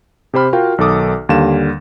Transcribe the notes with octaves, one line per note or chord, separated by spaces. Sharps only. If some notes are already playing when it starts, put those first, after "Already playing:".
C3 G4 C5 B5 F6
F4 F#4 A#4 F5 G5
B1 D#3 A4 D6 D#6
D#2 D3 G3 F5 E7